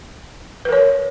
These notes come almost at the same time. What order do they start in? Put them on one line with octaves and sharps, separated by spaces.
B4 A#4 C#5